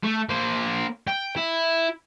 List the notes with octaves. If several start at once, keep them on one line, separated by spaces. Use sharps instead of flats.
A3
A#3 C5
G5
E4